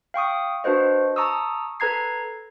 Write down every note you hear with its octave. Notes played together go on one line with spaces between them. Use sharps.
F5 G5 C#6 D#6
D4 F#4 B4 C5 D#5
A5 A#5 C#6 D#6 E6
A4 B4 A#5 G#6 C7